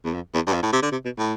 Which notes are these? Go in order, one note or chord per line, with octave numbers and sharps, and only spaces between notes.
E2
F2
E2
G2
F2
A2
C3
D3
C3
B2
A2